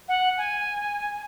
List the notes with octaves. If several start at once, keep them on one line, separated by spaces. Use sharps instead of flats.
F#5
G#5